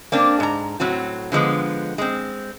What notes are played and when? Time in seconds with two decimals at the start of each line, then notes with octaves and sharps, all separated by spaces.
0.12 A#3 C4 D4
0.40 G#2 A#5
0.80 A2 F#3 C4 F#4
1.32 D3 F3 G#3 B3
1.98 G#3 C4